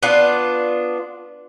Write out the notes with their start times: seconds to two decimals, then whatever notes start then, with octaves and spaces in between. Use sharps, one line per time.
0.03 B3 D4 F4